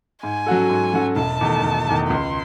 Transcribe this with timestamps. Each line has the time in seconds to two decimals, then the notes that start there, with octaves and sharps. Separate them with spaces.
0.23 G#2 G#5
0.46 F#3 C#4 F#4 A4
0.70 G#2
0.94 F#3 C#4 F#4 A4
1.16 E1 A5
1.41 E2 D#3 A3
1.64 E1
1.86 E2 D#3 A3
2.10 C#2 C6